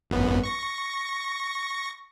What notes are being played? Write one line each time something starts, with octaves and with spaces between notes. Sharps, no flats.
G#1 F#2 B3
C#6 A#6